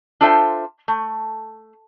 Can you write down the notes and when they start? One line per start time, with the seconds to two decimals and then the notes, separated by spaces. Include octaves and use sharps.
0.21 D4 F4 A4 C5 E5 G5
0.88 A3